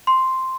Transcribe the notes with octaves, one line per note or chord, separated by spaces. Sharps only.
C6